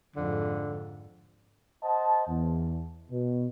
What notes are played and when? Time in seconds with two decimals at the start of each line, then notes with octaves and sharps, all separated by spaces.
0.16 F2 G#2 D3
1.83 C5 D#5 F#5 A5
2.28 E2
3.11 B2